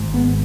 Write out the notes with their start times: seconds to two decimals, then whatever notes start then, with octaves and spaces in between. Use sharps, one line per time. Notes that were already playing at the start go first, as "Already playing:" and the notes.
Already playing: G#1 G#2
0.14 B3